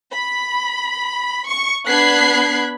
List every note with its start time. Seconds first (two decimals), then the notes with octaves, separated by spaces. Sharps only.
0.12 B5
1.46 C#6
1.88 B3 D4 B5 F#6 G#6 C7